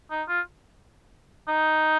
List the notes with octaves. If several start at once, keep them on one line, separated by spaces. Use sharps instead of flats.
D#4
F4
D#4